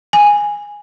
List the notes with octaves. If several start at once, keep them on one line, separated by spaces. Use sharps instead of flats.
G#5